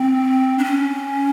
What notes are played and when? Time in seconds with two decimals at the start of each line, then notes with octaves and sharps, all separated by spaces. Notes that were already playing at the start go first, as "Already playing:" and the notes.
Already playing: C4
0.58 D4
0.64 C#4